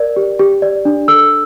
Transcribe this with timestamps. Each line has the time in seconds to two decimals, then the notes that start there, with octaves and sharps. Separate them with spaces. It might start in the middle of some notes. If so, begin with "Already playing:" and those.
Already playing: A#4 D5
0.16 G4
0.39 G4
0.62 D5
0.85 D4
1.08 A4 E6